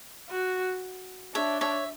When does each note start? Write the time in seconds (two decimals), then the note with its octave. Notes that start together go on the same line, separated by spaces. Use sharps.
0.30 F#4
1.34 D4 C#5 E5
1.61 C#5 E5